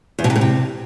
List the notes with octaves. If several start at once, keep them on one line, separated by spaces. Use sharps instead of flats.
E2
B2
C3
A2
C3